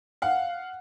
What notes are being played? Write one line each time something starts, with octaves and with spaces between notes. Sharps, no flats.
F5 F#5